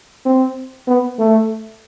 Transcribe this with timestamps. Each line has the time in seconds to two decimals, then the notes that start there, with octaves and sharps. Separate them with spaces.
0.26 C4
0.88 B3
1.19 A3